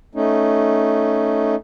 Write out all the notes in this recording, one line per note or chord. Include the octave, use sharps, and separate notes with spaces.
A3 C#4 D#4